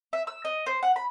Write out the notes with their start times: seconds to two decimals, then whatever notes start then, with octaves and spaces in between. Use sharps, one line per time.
0.13 E5
0.27 E6
0.45 D#5
0.66 C5
0.83 F#5
0.96 B5